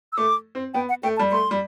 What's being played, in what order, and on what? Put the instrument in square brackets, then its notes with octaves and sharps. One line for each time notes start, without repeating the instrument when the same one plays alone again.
[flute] E6
[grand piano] A3 [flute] D6
[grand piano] C4
[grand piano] B3 [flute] G5
[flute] F#5
[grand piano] A3 [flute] G5
[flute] A5
[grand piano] G3
[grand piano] A3 [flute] C6
[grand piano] G3